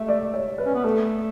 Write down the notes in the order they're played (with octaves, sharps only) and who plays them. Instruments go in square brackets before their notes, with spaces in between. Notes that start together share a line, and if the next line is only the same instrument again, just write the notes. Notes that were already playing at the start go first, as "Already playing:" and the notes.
Already playing: [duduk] A3 [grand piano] E5
[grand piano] D5
C#5
B4
[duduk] C#4
B3
[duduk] A3 [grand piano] A4